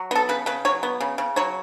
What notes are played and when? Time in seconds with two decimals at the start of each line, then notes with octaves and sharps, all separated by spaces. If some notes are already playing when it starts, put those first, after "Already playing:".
Already playing: F#3
0.11 B3 A4
0.29 C#3 B4
0.46 C#3 B4
0.65 F#3 C#5
0.83 B3
1.00 C#3
1.18 C#3
1.36 F#3 C#5